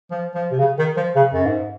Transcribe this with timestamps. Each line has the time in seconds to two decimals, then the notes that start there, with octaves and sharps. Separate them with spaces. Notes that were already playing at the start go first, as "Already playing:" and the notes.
0.11 F3
0.35 F3
0.51 C3
0.59 C#3
0.79 D#3
0.97 F3
1.16 C#3
1.33 F#2
1.45 G#2